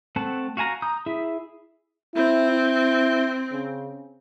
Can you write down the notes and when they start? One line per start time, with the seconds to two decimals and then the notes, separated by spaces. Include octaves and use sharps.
0.16 A3 C4 F#5 A5
0.57 F#4 F5 G#5 A#5
0.82 A#5 D#6 G6
1.06 E4 G#4 E5
2.15 C4 E4
2.51 E4
3.51 C#3